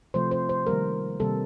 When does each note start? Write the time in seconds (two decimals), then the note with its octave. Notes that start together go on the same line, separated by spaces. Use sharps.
0.14 C3 F3 A3 C5
0.31 C5
0.49 C5
0.67 D#3 G3 A#3 A#4
1.20 C3 D#3 G3 A#3 A4